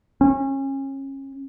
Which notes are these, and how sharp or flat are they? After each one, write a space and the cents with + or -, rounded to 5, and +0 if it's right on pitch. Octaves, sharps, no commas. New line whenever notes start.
C#4 -30